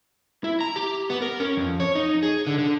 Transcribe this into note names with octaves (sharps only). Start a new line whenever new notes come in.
E4
A#5
G4
B3
A#4
C#4
F2
C#5
D#4
G#4
D3
D3